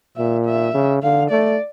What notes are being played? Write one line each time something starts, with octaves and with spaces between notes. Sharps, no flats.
A#2 E5
E5
C#3
D3 F5
A3 D5